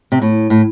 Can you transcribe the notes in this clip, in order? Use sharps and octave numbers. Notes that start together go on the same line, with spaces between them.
C3
A2
A2